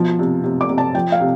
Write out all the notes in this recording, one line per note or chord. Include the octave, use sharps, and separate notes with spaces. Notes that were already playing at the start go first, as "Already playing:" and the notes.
Already playing: B2 F3
C3
C3
D6
C3
A5
F3 G5
F5
C3